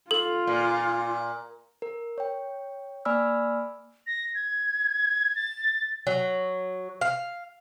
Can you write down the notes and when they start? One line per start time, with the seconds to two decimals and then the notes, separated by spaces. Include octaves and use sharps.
0.11 F4 A4
0.47 A#2
1.82 A#4
2.18 C#5 G5
3.05 A#3 D5 G#5 B5 E6 F6
4.07 A#6
4.35 G#6
5.35 A6
6.07 F#3
7.01 F5